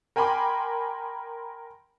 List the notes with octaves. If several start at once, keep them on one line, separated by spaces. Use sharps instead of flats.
A#4 G5 G#5 B5 C6 D6